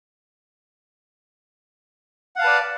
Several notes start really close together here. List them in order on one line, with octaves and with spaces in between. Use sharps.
F#5 F5 A5 B4 D5